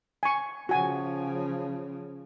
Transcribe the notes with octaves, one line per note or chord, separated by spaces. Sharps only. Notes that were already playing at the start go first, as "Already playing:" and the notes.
G#5 C#6
C#3 F3 F#4 G#5